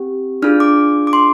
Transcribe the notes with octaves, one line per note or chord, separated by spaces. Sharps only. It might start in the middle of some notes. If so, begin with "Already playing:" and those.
Already playing: C4 G4
D4 F4 G#4 F6
D6
D6
C6